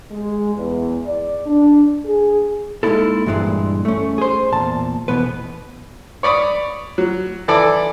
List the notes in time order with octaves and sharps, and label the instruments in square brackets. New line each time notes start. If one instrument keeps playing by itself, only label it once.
[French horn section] G#3
E2
D5
D4
G#4
[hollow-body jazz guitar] G#3 A#3 C4 D#4 E4 A4
G2 A#2 E3 G3 G#3
A3 C#4
G#4 C5
E2 A#2 A5
B2 E3 B3 B4
[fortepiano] C#5 D5 B5 D#6
F#3
E3 A4 D5 D6